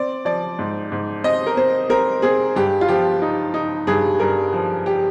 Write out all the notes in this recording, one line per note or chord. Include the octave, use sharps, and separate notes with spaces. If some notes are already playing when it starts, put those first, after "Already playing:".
Already playing: C4 D5
F3 D5
G#2
G#2
C4 D#5
A#4
C4 C5
C4 A#4
C4 G#4
G2 G4
F4
F3 G4
D#4
D#4
G2 G#4
G2 A#4
F3
G4